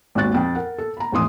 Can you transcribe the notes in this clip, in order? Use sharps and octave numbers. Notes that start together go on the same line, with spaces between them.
G#1 D#2 F#4 F#6 A6
F2 G5
A#4 F#5
A4
A#5 B5
F1 A2 E3 C6 D#6